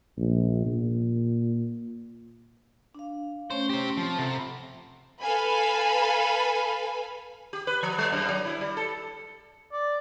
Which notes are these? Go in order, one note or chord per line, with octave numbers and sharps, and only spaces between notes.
A#1
A#2
D4 F5
A3 C#4 C5 C#5
G4 C5
F3 C4 A5
C3 A4 F#5 B5
A4 B4 F5 G#5 B5
G4
B4
F3
G3
F#2
F#3
E4
G3
A4
D5